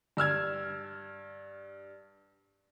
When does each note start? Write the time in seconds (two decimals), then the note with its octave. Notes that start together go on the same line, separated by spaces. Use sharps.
0.17 G2 E6 F6 G#6